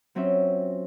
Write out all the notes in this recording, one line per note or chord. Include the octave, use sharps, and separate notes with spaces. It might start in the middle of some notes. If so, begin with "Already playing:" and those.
F#3 C4 C#4 F4 E5